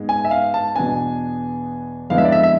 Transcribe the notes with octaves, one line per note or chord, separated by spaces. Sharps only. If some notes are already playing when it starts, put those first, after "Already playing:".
Already playing: G#2 G#3 B3
G#5
E5
F5
A5
E2 B2 B3 D4 G#5
F2 D3 G#3 B3 E4 F5
E5
D5
E5
E5